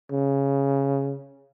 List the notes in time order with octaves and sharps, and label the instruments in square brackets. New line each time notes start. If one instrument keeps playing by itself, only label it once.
[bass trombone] C#3